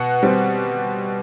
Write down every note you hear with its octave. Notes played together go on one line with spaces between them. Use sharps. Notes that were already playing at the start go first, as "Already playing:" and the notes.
Already playing: B2 F#5
G3 C4